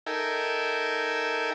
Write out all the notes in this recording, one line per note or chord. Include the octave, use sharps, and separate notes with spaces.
D#4 A4 A#4 E5 G5 G#5